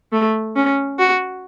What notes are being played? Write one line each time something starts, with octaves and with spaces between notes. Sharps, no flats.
A3
C#4
F#4